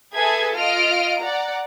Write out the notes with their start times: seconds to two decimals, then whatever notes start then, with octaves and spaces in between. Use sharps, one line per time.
0.14 G#4 A4 B4 E5 G#6
0.54 F4 D#5 F6 D7
1.20 D5 F#5 A#5